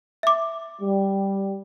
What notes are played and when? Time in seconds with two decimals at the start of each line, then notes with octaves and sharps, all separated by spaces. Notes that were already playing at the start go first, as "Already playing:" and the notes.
0.23 E5 D6
0.81 G3